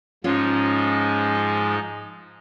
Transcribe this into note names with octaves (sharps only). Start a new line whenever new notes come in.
G#2 F3 G#3 C#4 D#4 F4